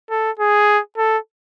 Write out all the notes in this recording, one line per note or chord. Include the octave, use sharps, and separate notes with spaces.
A4
G#4
A4